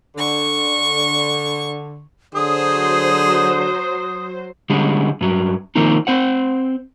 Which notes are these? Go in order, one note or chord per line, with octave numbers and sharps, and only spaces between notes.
D3 C#6
D3 F#3 G#4 C5 D#6
D3 G3 G#3 C#4
G2 F#3
D#3 F3 A#3 C4 D#4
C4 C5 F#5